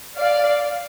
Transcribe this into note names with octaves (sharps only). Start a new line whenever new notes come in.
D5 F5